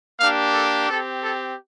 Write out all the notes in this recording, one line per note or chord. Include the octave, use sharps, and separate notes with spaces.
A#3 D4 G4 F5
A4
C4 G4 A4
A4